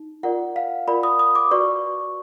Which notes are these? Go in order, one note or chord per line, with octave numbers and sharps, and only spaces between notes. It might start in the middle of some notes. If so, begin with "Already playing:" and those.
Already playing: D#4
F4 A#4 D5 F#5
F5
F4 A#4 D5 B5
D#6
D#6
D6
F#4 B4 D5 C#6